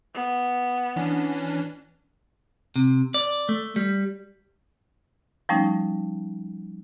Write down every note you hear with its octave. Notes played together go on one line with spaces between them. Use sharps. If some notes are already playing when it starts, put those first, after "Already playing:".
B3
E3 C#4 D4
C3
D5
A3
G3
F3 G3 A3 C#4 D#4